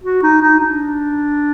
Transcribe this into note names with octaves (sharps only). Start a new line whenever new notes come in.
F#4
D#4
D#4
D4